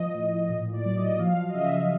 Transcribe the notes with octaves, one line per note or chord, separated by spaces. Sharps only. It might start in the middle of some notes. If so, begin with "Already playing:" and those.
Already playing: F3 D#5
A2
A#2 D#5
D5
F#3
D#5
F3 F5
D#5
C#3 E5